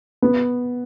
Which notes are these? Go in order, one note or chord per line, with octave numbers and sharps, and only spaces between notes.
B3